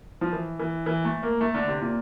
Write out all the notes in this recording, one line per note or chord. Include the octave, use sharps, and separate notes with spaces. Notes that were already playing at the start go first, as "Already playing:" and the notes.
F3
E3
E3
E3
A3
A#3
A3
D3
C3
A#2